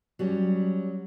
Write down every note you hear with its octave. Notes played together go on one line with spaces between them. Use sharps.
F#3 G3 C#4